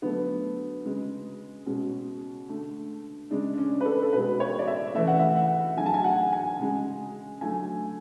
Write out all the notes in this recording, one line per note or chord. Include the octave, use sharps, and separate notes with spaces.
D3 F#3 A3 B3
C#3 G#3
B2 G#3 C#4
D3 A3
C#3 G#3 D4
D4
C#4
B4
A4
A4
B2 G#3 B4
C#5
D5
E5
C#3 E3 A3 E5
F#5
E5
F#5
D3 F#3 A3 G#5
A5
G#5
F#5
G#5
C#3 G#3
D3 F#3 A3 G#5